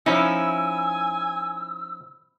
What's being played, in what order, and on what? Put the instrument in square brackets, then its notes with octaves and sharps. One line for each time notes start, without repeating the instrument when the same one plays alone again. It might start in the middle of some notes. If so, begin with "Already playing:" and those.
[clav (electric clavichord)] F3 C#4 D#4 [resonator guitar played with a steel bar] E4 [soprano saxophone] G#5 [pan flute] E6